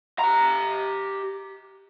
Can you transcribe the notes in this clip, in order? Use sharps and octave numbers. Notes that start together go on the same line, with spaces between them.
G4 A#5